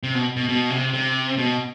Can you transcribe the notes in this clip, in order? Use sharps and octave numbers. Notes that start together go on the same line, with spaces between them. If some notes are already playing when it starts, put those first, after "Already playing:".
C3
B2
B2
B2
C3
C3
B2